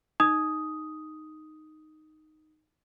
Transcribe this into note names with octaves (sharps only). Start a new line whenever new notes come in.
D#4 D#6